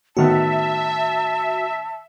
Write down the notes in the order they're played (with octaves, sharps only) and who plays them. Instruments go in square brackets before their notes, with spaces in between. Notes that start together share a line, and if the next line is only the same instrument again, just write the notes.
[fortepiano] A2 D#3 B3 [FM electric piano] F#4 [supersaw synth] E5 [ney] A5